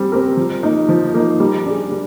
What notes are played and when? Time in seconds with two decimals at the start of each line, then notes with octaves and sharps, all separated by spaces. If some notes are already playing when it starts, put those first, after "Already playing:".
Already playing: G3 C4 G4
0.12 C4 G4 A#4
0.37 F3
0.63 A#3 D#4
0.89 F3
1.14 A#3 D#4
1.40 G3
1.66 D4 G#4
1.92 G3